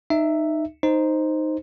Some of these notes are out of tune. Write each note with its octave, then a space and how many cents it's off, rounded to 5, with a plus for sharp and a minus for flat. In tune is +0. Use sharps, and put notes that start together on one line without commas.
D#4 -15 E5 +0
D#4 +0 C5 +0